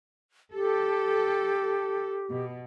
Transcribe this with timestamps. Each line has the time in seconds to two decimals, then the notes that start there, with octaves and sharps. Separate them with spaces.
0.53 G4 A4
2.29 B2